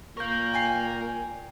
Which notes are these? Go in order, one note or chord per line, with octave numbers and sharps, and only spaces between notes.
A#2 A#4 F5 C#6 G6
G5 G#5 C7